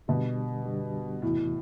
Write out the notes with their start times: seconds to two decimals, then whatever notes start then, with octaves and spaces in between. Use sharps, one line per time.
0.08 B2 D3 G3 D4 G4
0.66 F#2 D3 G3 D4 G4
1.22 E2 A2 C3 E3 B3 F#4